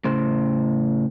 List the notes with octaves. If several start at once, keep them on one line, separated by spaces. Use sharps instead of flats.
A2 C#3 C5